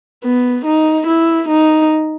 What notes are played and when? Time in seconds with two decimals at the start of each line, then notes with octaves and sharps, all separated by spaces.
0.24 B3
0.66 D#4
1.07 E4
1.48 D#4